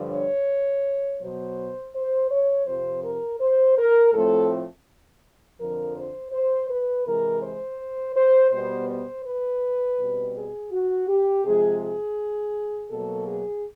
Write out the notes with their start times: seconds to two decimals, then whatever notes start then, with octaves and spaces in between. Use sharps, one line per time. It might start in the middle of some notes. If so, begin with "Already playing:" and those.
Already playing: G2 D3 F3
0.12 C#5
1.21 B2 F#3 B3 C5
1.94 C5
2.30 C#5
2.67 F2 C3 F3 C5
3.03 A#4
3.40 C5
3.78 A#4
4.13 A2 F3 A3 C4 A4
5.60 F2 D3 F3 A#4
5.97 C5
6.33 C5
6.70 B4
7.06 C3 E3 G#3 A#4
7.43 C5
8.16 C5
8.52 B2 G3 B3 C5
8.90 C5
9.25 B4
9.98 B2 G3 C4
10.35 G#4
10.72 F#4
11.08 G4
11.45 C3 F3 G#3 G#4
11.81 G#4
12.91 B2 F#3 A#3 A4
13.28 G#4